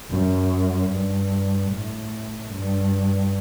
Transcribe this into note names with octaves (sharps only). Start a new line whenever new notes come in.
F#2
G2
A2
G2